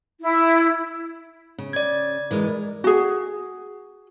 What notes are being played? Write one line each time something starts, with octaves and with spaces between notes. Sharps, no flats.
E4
C#3
D5 G#6
E3 G#3 A#4
F#4 G#4